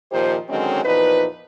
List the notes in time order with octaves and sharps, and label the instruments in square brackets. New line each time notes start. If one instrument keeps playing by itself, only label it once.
[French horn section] A#2 D#3 F3 G4 C5
D3 D#3 F#3 G#3 C4 C#4
E2 A#2 F3 D#4 B4